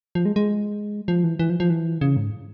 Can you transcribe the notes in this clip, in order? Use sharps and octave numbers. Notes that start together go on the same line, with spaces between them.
F3
G#3
G#3
F3
E3
E3
F3
F3
E3
C#3
G#2